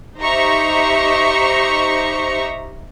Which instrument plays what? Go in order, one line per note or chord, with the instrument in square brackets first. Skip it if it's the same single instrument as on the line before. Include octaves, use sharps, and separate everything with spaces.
[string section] D#4 G4 C5 E5 A#5 C#6